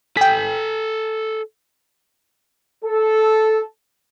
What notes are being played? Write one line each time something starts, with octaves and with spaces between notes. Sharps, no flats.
A4 G5 G#5 B6
A4